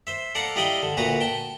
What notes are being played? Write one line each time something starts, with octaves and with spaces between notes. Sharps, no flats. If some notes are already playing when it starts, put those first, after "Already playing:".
C5 E5
A4 D5 F5 F#5 A#5
G3 E4 D5 D#5 F5 G5
D3
D2 A#2 F#4 B4 F#5 A#5
G5 A5